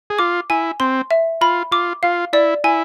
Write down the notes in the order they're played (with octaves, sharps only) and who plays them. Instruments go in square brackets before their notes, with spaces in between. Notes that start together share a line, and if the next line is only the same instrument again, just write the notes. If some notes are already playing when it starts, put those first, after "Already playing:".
[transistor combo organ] G#4
[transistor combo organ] F4 [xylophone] D6
[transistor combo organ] E4 [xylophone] G#5
[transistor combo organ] C4 [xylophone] C6
[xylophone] E5
[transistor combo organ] F4 [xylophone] B5
[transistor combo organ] F4 [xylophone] D6
[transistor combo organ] F4 [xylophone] F5
[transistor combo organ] E4 [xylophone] D5
[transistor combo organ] E4 [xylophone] G#5